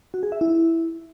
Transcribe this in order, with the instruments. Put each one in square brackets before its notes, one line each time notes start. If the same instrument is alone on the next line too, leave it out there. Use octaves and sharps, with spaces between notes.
[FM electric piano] F#4
G#4
E5
E4